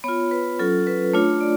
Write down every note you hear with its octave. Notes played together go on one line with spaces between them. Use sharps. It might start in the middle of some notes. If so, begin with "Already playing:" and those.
B3 F4 C#5
B4
F#3 C#4 F4 A4
B4
A3 D4 F4 C#5
D5